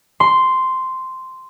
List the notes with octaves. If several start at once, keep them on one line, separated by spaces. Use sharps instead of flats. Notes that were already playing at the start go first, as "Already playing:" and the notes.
C6